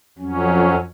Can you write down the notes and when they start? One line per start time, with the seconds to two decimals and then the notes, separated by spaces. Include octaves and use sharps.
0.19 F2 F#3 C#4